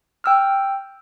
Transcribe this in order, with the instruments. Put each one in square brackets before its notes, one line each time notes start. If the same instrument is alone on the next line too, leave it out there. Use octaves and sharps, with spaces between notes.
[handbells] G5 E6 F6